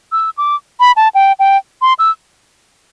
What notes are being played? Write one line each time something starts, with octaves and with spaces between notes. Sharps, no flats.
E6
D6
B5
A5
G5
G5
C6
E6